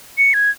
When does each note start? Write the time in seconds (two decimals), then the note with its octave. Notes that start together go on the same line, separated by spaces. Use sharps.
0.18 C#7
0.34 G#6